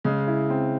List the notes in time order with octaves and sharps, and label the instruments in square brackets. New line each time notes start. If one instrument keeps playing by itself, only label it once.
[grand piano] C#3 [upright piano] G#3
[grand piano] E4
C4